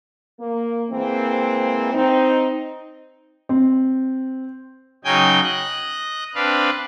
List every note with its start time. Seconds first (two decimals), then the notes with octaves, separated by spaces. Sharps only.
0.40 A#3
0.90 E3 G#3 A#3 C4
1.93 C4 D#4
3.49 C4
5.05 C#3 F#3 D#4 G5 G#5 G6
5.43 D#5 F#6
6.35 C4 D4 B4 F5